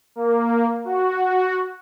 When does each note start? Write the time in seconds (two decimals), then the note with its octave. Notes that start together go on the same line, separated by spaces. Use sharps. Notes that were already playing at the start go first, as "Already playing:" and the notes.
0.16 A#3
0.85 F#4